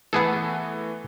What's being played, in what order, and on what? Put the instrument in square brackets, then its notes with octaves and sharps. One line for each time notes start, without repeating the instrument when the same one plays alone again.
[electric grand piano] E3 A3 [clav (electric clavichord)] B3 G#4 A4